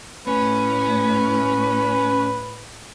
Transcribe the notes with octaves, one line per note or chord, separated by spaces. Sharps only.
A2 C#4 B4